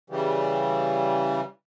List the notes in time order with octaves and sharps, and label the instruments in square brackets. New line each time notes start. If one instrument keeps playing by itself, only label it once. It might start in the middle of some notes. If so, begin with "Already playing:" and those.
[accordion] C#3 E3 G3